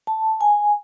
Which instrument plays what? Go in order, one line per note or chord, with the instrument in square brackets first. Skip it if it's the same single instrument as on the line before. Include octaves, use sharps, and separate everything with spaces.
[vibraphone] A5
G#5